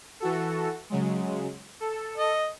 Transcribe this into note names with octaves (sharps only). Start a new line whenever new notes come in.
E3 F#4 A4
C#3 F#3 G#3
A4
D#5